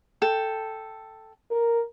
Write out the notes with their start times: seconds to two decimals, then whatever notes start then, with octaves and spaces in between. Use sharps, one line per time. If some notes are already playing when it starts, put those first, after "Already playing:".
0.22 A4 G5
1.51 A#4